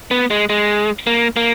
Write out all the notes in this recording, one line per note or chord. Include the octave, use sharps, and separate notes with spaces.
B3
G#3
G#3
A#3
A#3